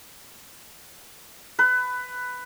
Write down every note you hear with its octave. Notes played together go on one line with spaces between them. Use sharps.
B4